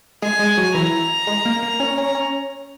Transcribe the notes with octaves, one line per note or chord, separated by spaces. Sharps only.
G#3 G#4 G#5
G#3 G#4
F#3 F#4
E3 E4 A#5
G#3 G#4
A#3 A#4
A#3 A#4
C#4 C#5
C#4 C#5
C#4 C#5